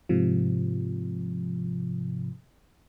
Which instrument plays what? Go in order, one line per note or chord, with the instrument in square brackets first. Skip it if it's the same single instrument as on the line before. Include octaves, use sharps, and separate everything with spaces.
[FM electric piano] G#2 C3 F3